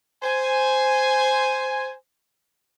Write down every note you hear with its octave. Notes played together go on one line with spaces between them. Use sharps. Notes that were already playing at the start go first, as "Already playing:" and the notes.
C5 G#5